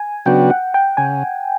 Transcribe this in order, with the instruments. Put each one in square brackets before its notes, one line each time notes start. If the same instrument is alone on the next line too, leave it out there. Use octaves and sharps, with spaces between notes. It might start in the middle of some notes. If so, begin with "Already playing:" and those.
Already playing: [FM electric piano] G#5
[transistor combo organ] C#3 F#3 B3 D4 F#4 [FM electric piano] G5
[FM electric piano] F#5
G5
[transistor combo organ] C#3 [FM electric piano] G#5